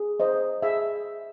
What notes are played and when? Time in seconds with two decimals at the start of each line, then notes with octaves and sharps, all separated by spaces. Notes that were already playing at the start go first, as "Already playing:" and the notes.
Already playing: G#4
0.20 C5 D#5
0.62 G#4 E5